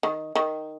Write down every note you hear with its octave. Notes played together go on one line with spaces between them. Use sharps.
D#3
D#3